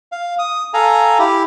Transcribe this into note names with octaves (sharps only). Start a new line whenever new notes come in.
F5
D#6
A4 F5 G#5 A#5
E4 G4